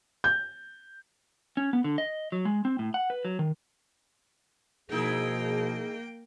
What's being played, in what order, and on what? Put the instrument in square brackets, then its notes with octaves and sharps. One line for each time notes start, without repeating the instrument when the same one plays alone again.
[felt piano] G6
[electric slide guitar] C#4
B3
D3
D#5
F#3
G#3
C4
A2
F#5
B4
F#3
D#3
[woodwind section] B2 F3 G#4 [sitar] G#3 D#4 E4 [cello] A#3 G5